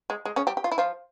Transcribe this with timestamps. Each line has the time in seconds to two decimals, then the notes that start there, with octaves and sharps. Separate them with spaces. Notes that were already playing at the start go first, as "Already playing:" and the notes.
0.10 G#3
0.25 G#3
0.36 C#3 C#4
0.47 G3 G4
0.57 G4
0.64 F4
0.72 E4
0.78 F3 F4